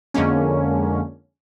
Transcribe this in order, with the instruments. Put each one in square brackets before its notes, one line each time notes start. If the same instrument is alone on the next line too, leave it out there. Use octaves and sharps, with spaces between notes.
[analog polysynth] F2 D3 G#3 A#3 C#4